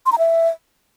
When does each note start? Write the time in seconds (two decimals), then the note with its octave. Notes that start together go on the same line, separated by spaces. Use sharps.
0.06 C6
0.12 A#5
0.19 E5